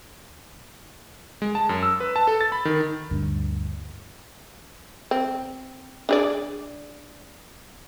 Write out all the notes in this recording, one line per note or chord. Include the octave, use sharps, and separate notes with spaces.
G#3
A5
F#2
E6
B4
A5
A4
A6
B5
D#3
D2 G2
C4
D4 G#4 D5